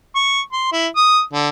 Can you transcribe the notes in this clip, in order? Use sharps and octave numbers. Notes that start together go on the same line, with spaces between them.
C#6
C6
E4
D#6
D3